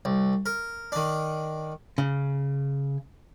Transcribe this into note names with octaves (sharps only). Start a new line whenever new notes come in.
C2
A#4
D#3 D4
C#3